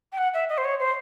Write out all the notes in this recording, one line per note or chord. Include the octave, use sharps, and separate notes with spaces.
G5
F#5
E5
D#5
C5
C#5
C5